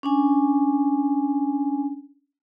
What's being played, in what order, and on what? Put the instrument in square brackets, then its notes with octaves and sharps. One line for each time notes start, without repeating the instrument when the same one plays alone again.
[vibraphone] C#4 D4 G#5